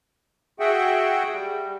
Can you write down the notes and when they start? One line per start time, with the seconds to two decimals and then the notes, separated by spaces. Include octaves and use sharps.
0.60 F#4 G#4 E5 F#5 G5
1.32 G3